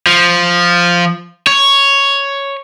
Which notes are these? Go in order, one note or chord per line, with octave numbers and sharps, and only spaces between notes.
F3
C#5